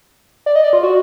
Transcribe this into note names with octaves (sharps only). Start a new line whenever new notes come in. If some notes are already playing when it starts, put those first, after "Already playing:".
D5
D#5
D5
F4
F#4